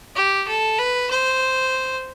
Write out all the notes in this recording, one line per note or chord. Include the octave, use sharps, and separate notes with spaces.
G4
A4
B4
C5